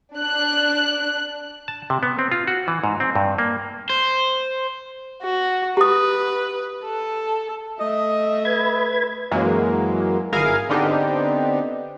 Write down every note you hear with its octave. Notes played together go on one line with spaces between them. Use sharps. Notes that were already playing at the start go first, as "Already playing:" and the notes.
D4 F#6
A5
C3
B3
C4
F4
F#4
E3
G#2
C4
G2
A#3
C5
F#4
G4 B4 D#6
A4
A3 D#5 E5
B4 G#6
F#2 E3 F#3 G#3 A#3
G#1 E4 G#4 A#4 F5 G#5
D3 B3 C4 D4 D#4 G4